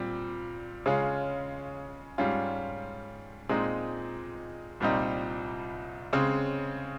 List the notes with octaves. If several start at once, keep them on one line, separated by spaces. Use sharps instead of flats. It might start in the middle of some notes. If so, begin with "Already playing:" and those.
Already playing: A#2 G3 C4
C#3 G#3 C#4 F4
G#2 G3 C#4 F4
A#2 G#3 C4 D#4
C2 A#2 G3 C4 D#4
C#3 G#3 C4